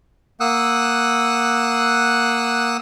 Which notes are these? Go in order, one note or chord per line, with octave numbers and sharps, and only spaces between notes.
A#3 F#5 D#6 E6 F#6